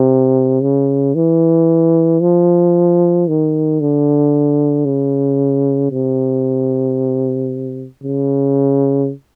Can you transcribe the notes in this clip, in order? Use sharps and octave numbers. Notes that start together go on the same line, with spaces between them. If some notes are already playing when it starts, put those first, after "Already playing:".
Already playing: C3
C#3
E3
F3
D#3
D3
C#3
C3
C#3